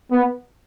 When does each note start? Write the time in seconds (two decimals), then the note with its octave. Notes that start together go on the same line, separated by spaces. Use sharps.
0.12 B3